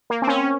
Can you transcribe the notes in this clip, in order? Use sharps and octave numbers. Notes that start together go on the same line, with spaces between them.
A#3
C4
C#4